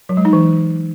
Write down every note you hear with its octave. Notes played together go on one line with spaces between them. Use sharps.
F#3
G#3
D#4
E3